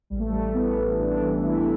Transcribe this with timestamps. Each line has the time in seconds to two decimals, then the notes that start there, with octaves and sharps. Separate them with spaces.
0.10 A1 G3
0.19 A3
0.29 A1 G3
0.54 E3 B3
0.76 A1
0.98 A1 D4
1.21 E3
1.43 E3 E4